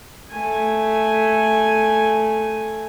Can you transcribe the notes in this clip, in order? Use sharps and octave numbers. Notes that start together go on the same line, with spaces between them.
A3 G#5